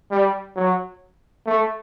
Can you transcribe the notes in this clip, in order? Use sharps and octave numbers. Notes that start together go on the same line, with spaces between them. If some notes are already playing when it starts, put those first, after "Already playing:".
G3
F#3
A3